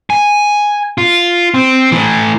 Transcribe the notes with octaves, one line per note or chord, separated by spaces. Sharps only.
G#5
F4
C4
A2 E3